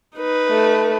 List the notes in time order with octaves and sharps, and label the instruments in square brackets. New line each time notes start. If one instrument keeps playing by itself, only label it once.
[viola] D#4 B4
[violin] A3